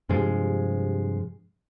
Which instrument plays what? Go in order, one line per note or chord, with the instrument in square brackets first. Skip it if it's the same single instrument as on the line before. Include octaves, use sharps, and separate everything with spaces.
[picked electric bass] G2 C3 F3 G#3